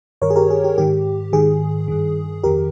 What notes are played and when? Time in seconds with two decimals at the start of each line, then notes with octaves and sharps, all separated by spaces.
0.22 G2 D#3 A#4 C#5
0.30 G#4
0.36 G4 A#4
0.50 G#4
0.64 G4
0.78 G#2 D#3 G4
1.33 G#2 D#3 G#4
1.88 G2 D#3
2.44 F2 D#3 G4 A#4